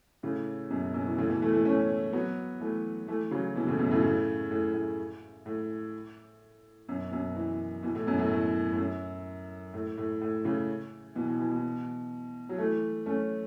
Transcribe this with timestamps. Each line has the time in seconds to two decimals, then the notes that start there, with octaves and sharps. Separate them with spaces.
0.23 A2 C#3
0.70 F#2 B2
0.94 F#2 B2
1.06 E3
1.18 A2 C#3
1.30 B2 E3
1.42 E3 A3
1.53 E3 A3
1.65 A3 C#4
2.13 F#3 B3
2.60 E3 A3
3.08 E3 A3
3.31 C#3 F#3
3.55 B2 E3
3.67 A2 C#3
3.79 F#2 B2
3.91 A2 C#3
4.03 A2 C#3
4.51 A2
4.74 A2
5.46 A2
6.88 F#2 B2
7.11 F#2 B2
7.35 B2 E3
7.83 B2 E3
7.95 A2
8.07 F#2 B2
8.18 A2
8.31 A2
8.73 A2
8.78 F#2
9.74 A2
9.98 A2
10.21 A2
10.45 A2 C#3
11.15 B2 E3
11.28 B2 E3
11.39 B2 E3
11.51 B2 E3
12.49 F#3
12.58 E3 A3
13.06 A3 C#4